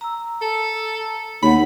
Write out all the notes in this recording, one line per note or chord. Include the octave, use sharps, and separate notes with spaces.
A#5 E6
A4
D#2 C#5 F#5 B5